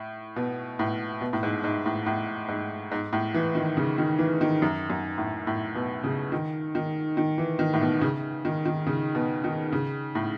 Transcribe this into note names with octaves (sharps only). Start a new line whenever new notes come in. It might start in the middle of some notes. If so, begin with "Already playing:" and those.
Already playing: A2
B2
A2
B2
A2
G#2
G#2
A2
A2
G#2
G#2
A2
E3
D#3
C#3
D#3
E3
D#3
F#2
F#2
A2
A2
B2
C#3
D#3
D#3
D#3
E3
D#3
A2
B2
C#3
D#3
D#3
C#3
B2
D#3
C#3
A2